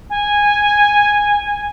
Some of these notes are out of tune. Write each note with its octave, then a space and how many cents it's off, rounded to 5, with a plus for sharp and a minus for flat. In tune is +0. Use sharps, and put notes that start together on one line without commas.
G#5 -10